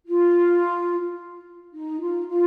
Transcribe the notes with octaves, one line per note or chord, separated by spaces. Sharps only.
F4
D#4
F4
F4